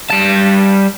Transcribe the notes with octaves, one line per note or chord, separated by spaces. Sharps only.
G3 A5